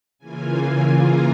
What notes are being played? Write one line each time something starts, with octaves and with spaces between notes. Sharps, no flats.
C#3 E3 A#3 F4 G#5
A#5